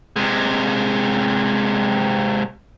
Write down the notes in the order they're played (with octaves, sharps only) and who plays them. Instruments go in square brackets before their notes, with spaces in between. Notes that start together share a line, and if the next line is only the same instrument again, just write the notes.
[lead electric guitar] C3 G#3